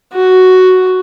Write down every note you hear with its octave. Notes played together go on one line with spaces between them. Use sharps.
F#4